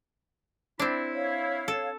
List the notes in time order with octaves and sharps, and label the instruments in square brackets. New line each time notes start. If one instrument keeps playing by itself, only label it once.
[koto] C4 D4 [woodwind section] E4
[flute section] C#5 F5
[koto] A4